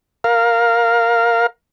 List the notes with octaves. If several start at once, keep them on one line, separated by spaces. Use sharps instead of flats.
A#4 F5